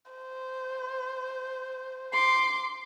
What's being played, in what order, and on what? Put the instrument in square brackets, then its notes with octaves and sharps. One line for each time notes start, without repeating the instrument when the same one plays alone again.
[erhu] C5
[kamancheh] C6 D6 [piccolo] C7